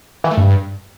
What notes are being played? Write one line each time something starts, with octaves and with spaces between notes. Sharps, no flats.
E3
A3
G2